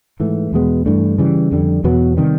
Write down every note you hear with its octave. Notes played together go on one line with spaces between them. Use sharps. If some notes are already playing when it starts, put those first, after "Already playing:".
G#2 E3 A3
E2 B2 G#3 B3
G2 E3 A3 D4
C#3 E3 G3
F2 D3 G3
E2 B2 F#3 B3
C3 D#3 G3